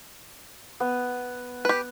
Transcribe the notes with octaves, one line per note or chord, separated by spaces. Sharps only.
B3
G4 B4